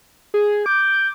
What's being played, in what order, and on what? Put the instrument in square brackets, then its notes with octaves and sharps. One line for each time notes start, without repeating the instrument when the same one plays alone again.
[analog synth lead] G#4
[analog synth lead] D6 [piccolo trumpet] G6